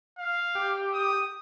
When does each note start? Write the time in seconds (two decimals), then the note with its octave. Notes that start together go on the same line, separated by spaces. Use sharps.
0.18 F5
0.55 G4
0.93 D#6